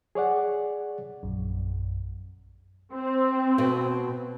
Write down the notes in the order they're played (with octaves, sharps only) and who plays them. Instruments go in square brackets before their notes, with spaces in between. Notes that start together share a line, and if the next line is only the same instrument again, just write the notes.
[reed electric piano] G#4 C#5 D5 F#5
[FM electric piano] A#1 F#2
[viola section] C4
[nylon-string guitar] B2